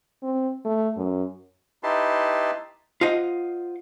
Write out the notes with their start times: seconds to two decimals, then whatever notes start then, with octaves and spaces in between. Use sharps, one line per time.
0.23 C4
0.65 A3
0.97 F#2
1.83 D#4 E4 G4 B4 A5 C6
3.01 F4 C5 D#5 F#5